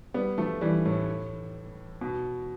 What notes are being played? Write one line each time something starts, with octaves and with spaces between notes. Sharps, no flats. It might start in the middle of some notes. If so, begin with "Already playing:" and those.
G3 B3
F3 A3
E3 G3
A2
B2